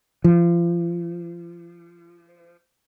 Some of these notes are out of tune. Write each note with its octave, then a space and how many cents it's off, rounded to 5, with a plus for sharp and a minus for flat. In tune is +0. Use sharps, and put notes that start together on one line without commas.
F3 -30